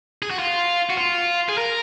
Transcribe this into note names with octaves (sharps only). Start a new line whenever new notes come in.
G#4
F#4
F4
F#4
F4
G#4
A#4